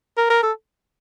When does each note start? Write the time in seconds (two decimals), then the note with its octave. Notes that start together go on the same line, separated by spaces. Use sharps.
0.17 A#4
0.30 A#4
0.43 A4